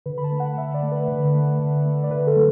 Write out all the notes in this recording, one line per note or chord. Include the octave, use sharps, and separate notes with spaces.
D3 B4
B5
A5
A3
F#5
D3 E5
D5
A3
B4
D3
A3
D3
A3
D5
D3 B4
A4
F#3 A3